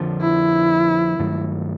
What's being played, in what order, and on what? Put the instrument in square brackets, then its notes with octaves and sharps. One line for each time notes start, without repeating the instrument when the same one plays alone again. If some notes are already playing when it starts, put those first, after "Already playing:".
Already playing: [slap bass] F2 D3 F3
[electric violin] E4
[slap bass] G2 D#3 F#3 A3